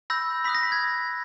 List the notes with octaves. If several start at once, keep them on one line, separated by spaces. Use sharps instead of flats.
B5 E6 G6 A#6
B5 D#6 F#6 B6
A#6
B6
G#6